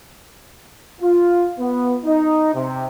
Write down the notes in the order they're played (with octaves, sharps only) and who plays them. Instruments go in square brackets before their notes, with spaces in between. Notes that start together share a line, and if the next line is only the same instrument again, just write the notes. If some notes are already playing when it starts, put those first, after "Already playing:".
[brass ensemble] F4
B3
D#4
C3